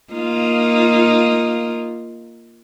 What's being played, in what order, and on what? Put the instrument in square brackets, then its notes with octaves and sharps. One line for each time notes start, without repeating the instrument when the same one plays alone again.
[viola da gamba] A#3 D#4 F4